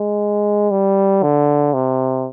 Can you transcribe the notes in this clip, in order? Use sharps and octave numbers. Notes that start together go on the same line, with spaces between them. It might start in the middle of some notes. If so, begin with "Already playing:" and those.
Already playing: G#3
G3
D3
C3